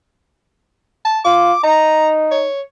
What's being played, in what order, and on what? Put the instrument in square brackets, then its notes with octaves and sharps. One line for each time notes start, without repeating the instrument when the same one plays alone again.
[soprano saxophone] A5
[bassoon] F4 [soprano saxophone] D6
[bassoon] D#4 [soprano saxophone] A#5
[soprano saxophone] C#5